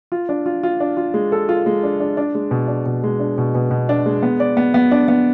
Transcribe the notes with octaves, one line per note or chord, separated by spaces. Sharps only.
F4
D4
F4
F4
D4
F4
G#3
A4
F4
G#3
D4
D4
D4
G#3
B2
D4
B2
G#3
D4
B2
B2
B2
D4
G#3
B3
D5
B3
B3
D4
B3